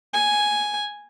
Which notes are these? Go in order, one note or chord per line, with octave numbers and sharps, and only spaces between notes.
G#5